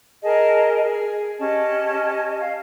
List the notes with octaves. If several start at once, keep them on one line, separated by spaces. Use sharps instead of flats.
G#4 A#4 D#5 A5
G#4
C#4 G4 D#5 A5
F5